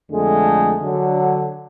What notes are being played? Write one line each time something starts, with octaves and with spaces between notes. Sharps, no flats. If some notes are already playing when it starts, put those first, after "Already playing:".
F2 D3 G#3 A3
D3 F#3